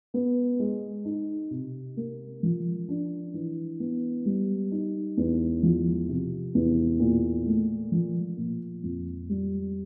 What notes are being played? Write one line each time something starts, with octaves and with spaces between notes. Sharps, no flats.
B3
G#3
D#4
C3
A#3
F3
D4
E3
B3
G3
D#4
E2
F3
C3
E2
A#2
A3
F3
A#2
F2
G3